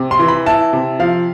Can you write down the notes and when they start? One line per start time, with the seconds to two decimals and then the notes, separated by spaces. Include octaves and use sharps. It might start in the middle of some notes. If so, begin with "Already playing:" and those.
Already playing: C3
0.11 C6
0.19 E3
0.28 B5
0.46 E4 A5
0.73 C3
0.99 F3 F5